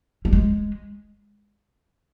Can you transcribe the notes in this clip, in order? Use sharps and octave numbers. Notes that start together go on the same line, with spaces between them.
G3
G#3